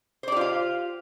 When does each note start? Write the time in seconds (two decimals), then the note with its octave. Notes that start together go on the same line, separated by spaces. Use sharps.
0.23 C5
0.28 D5
0.32 G4
0.37 F4
0.41 F5